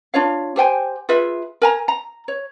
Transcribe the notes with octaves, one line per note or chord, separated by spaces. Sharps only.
D4 F4 C#5 F5
G4 C5 G5 G#5
F4 G#4 B4 E5
A#4 G#5 A#5
A#5
C#5